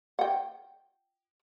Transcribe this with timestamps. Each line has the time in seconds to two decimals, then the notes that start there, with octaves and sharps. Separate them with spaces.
0.19 F#5 G5